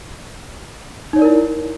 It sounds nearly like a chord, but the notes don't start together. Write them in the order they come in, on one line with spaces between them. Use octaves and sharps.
D#4 C#5 D5 A#4 E4